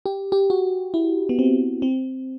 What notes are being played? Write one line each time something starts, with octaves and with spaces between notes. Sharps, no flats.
G4
G4
F#4
E4
B3
C4
C4